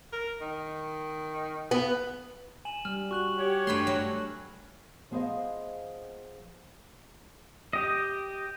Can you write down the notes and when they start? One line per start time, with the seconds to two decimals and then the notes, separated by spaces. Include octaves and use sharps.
0.13 A#4
0.41 D#3
1.71 B3
2.65 G#5 E7 F#7
2.85 G3 F6
3.11 F#4 C#6 F#6 F#7
3.38 G4 C#5
3.67 G2 A3 B5 C6
3.87 F#3
5.11 F3 B3 G#4 C5 D#5 F5
7.73 G4 D#5